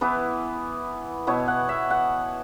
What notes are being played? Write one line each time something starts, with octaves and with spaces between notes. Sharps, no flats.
E3 B3 E4 B4
B2 B3 E4 C#5
F#5
E5
F#5